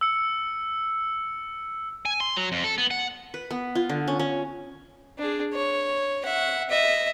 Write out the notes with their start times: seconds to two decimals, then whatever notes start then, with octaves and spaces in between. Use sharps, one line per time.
0.01 E6 C#7
2.05 G#5
2.20 C6
2.36 F#3
2.52 F2
2.64 A4
2.78 B3
2.91 F#5
3.34 B4
3.51 B3
3.75 F4
3.89 D3
4.08 C#4
4.19 C#4
5.18 D4 G#4
5.54 C#5
6.25 E5 F#5
6.69 D#5 E5